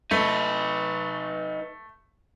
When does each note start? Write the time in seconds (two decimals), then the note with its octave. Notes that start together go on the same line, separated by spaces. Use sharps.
0.11 A3 D#4 B4